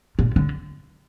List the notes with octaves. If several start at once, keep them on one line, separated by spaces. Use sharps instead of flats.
A#2
D3